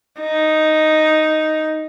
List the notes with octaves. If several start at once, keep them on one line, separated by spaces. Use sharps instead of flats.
D#4